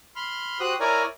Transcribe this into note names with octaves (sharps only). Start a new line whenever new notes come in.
B5 C6 F6
F#4 G4 C5 D#6 F#6
E4 A#4 C#5 D5 G#5 A#5